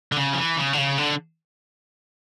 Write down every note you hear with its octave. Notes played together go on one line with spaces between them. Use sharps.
D3
C#3
F3
E3
C#3
D3
C#3
D3